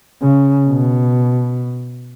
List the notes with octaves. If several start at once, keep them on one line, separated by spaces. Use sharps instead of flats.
C#3
B2